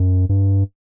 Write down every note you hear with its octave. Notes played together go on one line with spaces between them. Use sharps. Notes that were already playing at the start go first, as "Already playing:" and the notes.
Already playing: F#2
G2